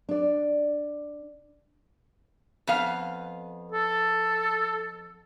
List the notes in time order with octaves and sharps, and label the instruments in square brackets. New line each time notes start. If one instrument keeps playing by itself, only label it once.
[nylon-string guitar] D4 D5
[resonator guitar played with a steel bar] F2 B3 F5
[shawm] A4